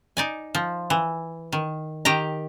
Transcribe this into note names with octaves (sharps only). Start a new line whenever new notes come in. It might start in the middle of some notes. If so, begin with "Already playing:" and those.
D#4 D5 G#5
F3
E3
D#3
D#3 G4 G5 A#5